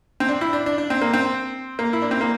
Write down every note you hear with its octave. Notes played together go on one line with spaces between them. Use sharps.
C4
D4
E4
D4
D4
D4
C4
A#3
C4
A#3
E4
D4
C4
A#3